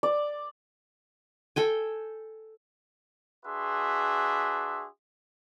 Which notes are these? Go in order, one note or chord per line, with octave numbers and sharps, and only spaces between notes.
D5
A4 G5 G#5
D4 F#4 G#4 B4 E5 C6